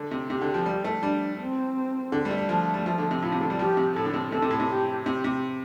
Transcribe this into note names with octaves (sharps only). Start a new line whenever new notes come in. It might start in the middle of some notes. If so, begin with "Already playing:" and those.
Already playing: D3
C3
C3 G4
D3
F3
G3
A3
G3 D4
C4
D3
G3
A3
G3
F3 A3
G3
F3
D3
C3
A2 F4
C3
D3
G3
F3 G4
C3
A2 A4
D3
C3
C3 A4
C3
A2
C3
G4
C3 G4
C3